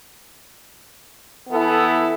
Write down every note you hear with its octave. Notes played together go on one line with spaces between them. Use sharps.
E3 B3 E4 A4